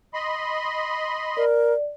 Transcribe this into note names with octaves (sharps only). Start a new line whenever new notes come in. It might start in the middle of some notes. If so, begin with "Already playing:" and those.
D#5 B5 C6
A#4 D5